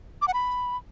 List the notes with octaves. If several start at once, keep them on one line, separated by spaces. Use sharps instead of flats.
D6
F#5
B5